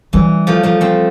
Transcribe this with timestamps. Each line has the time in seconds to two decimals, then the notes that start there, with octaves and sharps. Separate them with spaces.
0.13 E3 G3
0.47 F3 A3
0.63 F3 A3
0.81 A3 C4